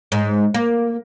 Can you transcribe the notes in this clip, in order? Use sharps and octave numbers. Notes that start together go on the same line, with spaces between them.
G#2
A#3